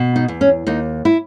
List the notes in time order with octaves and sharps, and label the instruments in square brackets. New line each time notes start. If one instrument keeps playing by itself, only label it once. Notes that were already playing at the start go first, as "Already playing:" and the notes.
Already playing: [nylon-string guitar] B2
D#4
E2
C#4
D#2 D#4
E4